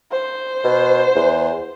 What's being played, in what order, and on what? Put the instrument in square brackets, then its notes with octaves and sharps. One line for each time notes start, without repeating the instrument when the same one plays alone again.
[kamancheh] C5
[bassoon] B2
E2